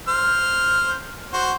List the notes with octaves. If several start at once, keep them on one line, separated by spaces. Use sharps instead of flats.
C5 F6
F#4 C5